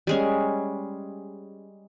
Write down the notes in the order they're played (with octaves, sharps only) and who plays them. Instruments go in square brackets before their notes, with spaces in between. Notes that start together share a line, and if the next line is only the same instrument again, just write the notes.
[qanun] G3 G#3 C#4